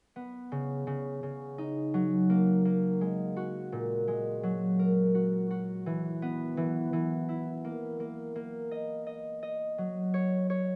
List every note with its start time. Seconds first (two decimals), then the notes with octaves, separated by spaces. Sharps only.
0.16 B3
0.52 C#3
0.87 C#3
1.23 C#3
1.58 D#4
1.94 F#3
2.30 A#3
2.65 A#3
3.01 G#3
3.36 F#4
3.72 A#2
4.08 G#3
4.43 F#3
4.79 A#4
5.15 F#4
5.51 F#4
5.86 E3
6.22 B3
6.57 E3
6.93 E3
7.29 E4
7.64 A#3
8.00 A#3
8.36 A#3
8.71 D#5
9.07 D#5
9.43 D#5
9.78 F#3
10.14 C#5
10.50 C#5